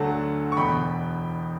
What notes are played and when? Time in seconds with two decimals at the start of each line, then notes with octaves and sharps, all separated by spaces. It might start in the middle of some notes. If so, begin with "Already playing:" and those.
Already playing: D2 D3 F#3 A3 F#5 A5
0.52 C#6
0.57 E1 E2 B2 G5 B5